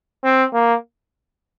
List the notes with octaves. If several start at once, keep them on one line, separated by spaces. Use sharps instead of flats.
C4
A#3